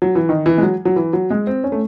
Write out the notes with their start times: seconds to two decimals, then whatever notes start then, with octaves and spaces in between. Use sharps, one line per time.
0.02 F#3
0.15 E3
0.29 D#3
0.46 E3
0.58 G#3
0.63 F#3
0.85 F#3
0.96 E3
1.13 F#3
1.30 G#3
1.47 C4
1.64 C#4
1.72 A3